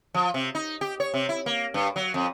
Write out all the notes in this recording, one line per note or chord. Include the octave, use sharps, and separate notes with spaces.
F3
C3
D#4
G4
C#5
C3
E4
A#3
G2
F#3
F2